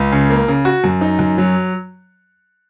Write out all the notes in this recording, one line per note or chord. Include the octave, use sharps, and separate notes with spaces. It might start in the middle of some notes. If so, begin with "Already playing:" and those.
Already playing: C#2
C#3
A#3
C#3
F#4
F#2
D#4
F#2
F#3